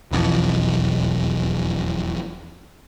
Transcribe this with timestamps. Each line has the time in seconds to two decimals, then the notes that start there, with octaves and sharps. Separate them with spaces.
0.11 E1 B1 F2 E3